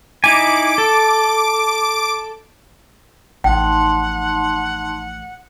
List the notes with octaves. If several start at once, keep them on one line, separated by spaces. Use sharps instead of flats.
D#4 E4 G#5 D6 D7
A4
A1 F3 D#4 F#5 G5 A5 C6